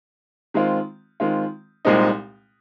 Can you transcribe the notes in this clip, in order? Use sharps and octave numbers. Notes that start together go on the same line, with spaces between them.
D#3 G#3 C4 F4
D#3 G#3 C4 F4
C2 A#2 G#3 C4 D#4